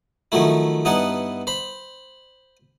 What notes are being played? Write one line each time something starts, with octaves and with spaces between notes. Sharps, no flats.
D#3 F3 F#3 A3 E4
G2 B3 D#4 E4 F#5 A5
C5 B5